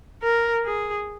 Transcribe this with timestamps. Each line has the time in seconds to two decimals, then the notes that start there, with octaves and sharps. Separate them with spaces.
0.22 A#4
0.64 G#4